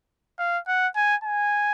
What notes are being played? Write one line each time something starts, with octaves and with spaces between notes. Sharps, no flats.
F5
F#5
G#5
G#5